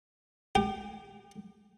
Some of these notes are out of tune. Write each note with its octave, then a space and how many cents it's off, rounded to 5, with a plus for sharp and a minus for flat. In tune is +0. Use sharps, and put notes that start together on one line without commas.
G4 +35 G5 -25